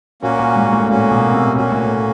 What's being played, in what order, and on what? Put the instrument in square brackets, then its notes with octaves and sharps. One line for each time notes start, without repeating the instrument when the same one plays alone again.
[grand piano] A#2 [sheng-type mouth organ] A#3 C#4 F#4
[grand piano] A#2
G#2
A2
[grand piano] A#2 [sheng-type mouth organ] A#3
[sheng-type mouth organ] C#4 F#4
[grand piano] B2
C3
[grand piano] A#2 [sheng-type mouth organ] A#3 C#4 F#4
[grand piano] A2